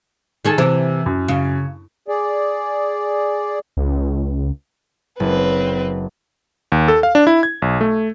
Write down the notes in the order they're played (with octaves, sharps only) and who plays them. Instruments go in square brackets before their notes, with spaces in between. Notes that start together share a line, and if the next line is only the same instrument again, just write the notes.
[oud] D#3 G#4 A4
[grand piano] C3 [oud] E3
[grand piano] F#2
[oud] C#3
[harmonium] G#4 D5
[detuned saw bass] C#2
[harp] F#1 [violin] C4 B4
[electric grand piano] D#2
A4
F5
D4
E4
G#6
B1
A3